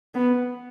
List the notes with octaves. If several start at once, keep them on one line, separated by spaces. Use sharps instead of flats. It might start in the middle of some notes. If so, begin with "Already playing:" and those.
B3